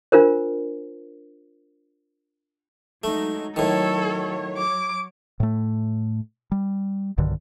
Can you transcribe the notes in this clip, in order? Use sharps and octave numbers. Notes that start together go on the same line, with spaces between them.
D4 F4 A#4 C5
F#3 G#3 A3 D#4
A2 D#3 F#3 A4 C#5
D6
A2 A3
G3
B1 G2 D3 D#3